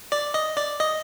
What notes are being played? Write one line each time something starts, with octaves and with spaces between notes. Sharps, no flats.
D5
D#5
D5
D#5